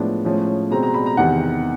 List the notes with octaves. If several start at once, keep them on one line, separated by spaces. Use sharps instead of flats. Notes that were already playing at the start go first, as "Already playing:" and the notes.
Already playing: A2 F3 G#3 B3 D4
A2 F3 G#3 C#4
B2 G#3 C4 A#5
A#5
B5
A#5
E2 C3 D#3 F#5